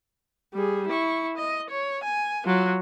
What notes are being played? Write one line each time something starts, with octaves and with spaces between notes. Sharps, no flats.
G3 G#4
E4 C#6
D#5
C#5
G#5
F#3 F4